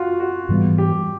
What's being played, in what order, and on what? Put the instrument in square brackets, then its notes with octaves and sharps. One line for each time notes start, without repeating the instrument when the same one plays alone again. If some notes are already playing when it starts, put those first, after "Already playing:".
Already playing: [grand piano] F4 F#4
F#4
[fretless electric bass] G#2 E3 G3 B3
[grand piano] G4